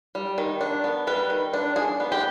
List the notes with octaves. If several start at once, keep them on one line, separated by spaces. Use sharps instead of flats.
G3
D#3
D4
B3
G3 B4
D#3
D4
D4 G#4
B3
G4